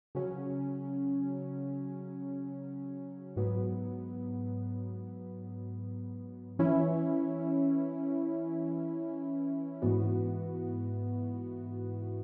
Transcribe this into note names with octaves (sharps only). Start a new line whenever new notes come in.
C#3 F#3 C#4
G#2 F#3 B3
E3 C#4 E4
G#2 E3 B3 F#4